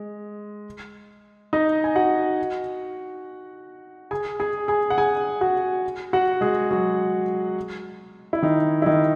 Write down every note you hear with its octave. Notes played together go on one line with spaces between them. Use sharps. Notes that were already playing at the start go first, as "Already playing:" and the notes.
Already playing: G#3
D#4 D#5
G#5
F#4 F#5
G#4 G#5
G#4 G#5
G#4 G#5
F#5
G#4 G#5
F#4 F#5
F#4 F#5
G#3 G#4
F#3 F#4
E4
D#3 D#4
E4
D#3 D#4